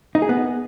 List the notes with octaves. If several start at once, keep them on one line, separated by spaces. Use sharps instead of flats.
D#4
G#4
B3